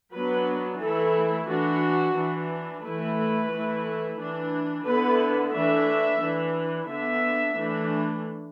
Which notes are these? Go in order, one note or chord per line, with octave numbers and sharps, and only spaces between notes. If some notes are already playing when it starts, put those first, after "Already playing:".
F#3 B3 D4 B4
E3 A3 E4 A4
E3 D4 F#4
E3 D4
E3 A3 E4 B4
E3 A3 E4
E3 D4
D3 B3 E4 B4
E3 A3 D4 E5
E3 D4
D3 B3 D4 E5
E3 A3 D4